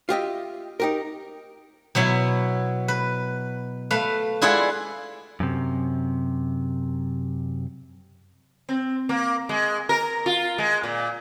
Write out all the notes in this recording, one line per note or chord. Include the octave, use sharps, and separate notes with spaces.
F4 G4 D#5 E5
D#4 G4 A#4
B2 F#3 B3 E4
B4
A3 B4 F5
G#3 E4 F4 G#4 D5 F#5
F#2 C3
C4
A#3
G#3
A#4
F4
G#3
A#2